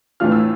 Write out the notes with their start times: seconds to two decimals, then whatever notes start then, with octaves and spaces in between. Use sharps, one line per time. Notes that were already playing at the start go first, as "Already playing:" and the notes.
0.20 A2 E3 A3 D4 F4 F6
0.32 E6